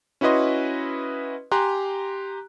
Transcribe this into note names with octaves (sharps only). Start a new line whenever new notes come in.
C#4 E4 F#4 B4 D#5 C6
G4 G#5 A#5 C6 F#6